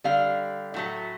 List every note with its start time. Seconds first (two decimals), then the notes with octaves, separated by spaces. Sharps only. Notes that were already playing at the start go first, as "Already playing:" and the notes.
0.04 D3 G3 F5
0.74 A2 F#3 A3